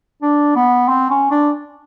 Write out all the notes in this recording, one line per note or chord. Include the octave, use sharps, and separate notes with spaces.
D4
B3
C4
C#4
D4